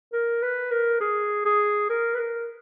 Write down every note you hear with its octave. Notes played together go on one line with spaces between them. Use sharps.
A#4
B4
A#4
G#4
G#4
A#4
B4
A#4